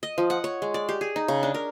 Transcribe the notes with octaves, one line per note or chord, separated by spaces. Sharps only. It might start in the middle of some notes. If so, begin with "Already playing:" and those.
D#5
F3
F#5
C#5
G#3
D5
G4
G#4
D#4
C#3
D4
A#4